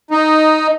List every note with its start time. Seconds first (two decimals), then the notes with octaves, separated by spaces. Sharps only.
0.11 D#4